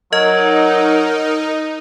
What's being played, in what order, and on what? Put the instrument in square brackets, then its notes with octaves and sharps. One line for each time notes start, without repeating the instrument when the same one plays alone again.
[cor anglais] F#3 [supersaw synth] D#4 [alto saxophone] A#4 [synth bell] D#5